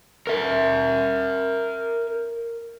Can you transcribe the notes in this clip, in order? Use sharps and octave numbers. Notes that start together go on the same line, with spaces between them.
A#4 E5